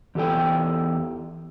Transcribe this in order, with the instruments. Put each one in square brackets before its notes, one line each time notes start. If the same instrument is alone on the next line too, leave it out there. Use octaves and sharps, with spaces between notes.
[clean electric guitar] E2 G4 A4 G5